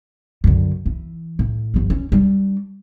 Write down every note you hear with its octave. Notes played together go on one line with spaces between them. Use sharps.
F#2 D3
E3
A2
G1 F3
C#4
G3 D4